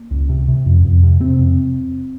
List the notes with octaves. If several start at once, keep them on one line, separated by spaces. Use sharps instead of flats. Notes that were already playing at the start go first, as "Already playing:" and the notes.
Already playing: A#3
C#2
C3
C3
F2
F2
C3
C3 C4
F2